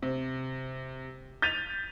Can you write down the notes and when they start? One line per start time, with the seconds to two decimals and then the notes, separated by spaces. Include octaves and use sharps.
0.02 C3
1.42 G6 A6 B6 D#7 F7